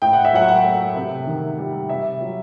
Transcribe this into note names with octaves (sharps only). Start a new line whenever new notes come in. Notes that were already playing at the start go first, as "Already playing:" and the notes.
A2 G5
F#5
E5
F#3 F#5
F#5
A3
C3
D#3
G3
C3 E5
F#3